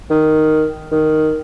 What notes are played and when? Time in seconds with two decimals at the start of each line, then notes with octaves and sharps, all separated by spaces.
0.10 D#3
0.92 D#3